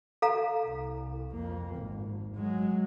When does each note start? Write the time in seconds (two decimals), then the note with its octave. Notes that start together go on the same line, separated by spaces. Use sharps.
0.22 A4 F5 A#5
0.67 C2
1.32 F2 A#3
1.76 G#1
2.35 F#3 G#3